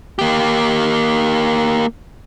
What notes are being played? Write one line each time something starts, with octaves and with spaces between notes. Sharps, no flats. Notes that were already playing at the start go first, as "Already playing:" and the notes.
A#3 G4